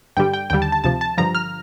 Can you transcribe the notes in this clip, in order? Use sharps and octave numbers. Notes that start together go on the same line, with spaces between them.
G2 D3 G3 G5
G5
D#2 D3 G3 G5
A5
A5
D2 C3 F3 A5
A5
G2 D3 F3 A#5
F6